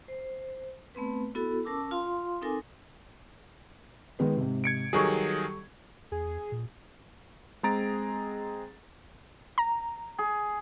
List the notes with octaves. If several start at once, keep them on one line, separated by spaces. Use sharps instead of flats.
C5
A3 B3 C4 B4
B3 E4 F#4 A4
C#4 A#4 A5 D6 E6
F4 F5 C6
C4 D#4 A4 A#4 G#5 D6
D#3 G#3 B3
G#2 C3
G#6 C#7 D7
D#3 F#3 G3 G#4 A4 C#6
E2 G#4
A#2
G#3 C4 G#4 A#5 A6 D7
A#5
G#4